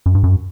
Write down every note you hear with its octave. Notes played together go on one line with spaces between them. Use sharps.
F#2
G2
F#2